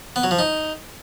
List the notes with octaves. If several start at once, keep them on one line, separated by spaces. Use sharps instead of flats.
B3
F#3
F3
D#4